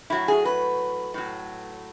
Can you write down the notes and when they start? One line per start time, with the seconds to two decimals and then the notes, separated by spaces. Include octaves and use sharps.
0.10 A2 F#3 E4
0.28 G#4
0.45 B4
1.14 A2 F#3